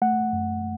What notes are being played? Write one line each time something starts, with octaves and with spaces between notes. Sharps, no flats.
A3 F#5
F#2